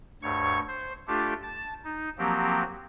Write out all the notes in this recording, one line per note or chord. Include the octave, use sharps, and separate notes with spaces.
D2 G2 C#5 C#6
C5
A3 D4 F4 G4 A4
A5
D#4
F3 F#3 A#3 C4 G4